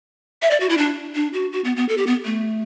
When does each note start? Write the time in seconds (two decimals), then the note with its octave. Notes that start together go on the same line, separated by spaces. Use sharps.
0.42 E5
0.51 D5
0.60 F#4
0.69 E4
0.78 D4
1.15 D4
1.33 F#4
1.52 F#4
1.65 B3
1.77 B3
1.89 A4
1.98 G4
2.07 B3
2.25 A3